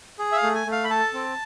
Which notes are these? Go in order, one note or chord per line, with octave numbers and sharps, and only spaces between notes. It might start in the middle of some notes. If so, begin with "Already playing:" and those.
G#4
E5
F5
A3
G#5
A3
F5
B5
A4 A5
C4